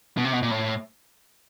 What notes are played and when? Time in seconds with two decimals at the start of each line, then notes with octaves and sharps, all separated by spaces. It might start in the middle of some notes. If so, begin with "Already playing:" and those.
0.17 B2
0.25 C3
0.33 B2
0.42 A#2
0.51 A2